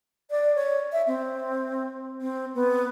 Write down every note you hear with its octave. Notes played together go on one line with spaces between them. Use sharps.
D5
C#5
E5
C4
C4
B3